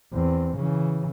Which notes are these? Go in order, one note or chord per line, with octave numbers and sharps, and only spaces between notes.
E2 C4
C#3 E3